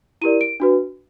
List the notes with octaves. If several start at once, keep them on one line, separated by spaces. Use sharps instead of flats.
E4 G4 A#4 D5 D#7
D7
D4 F#4 B4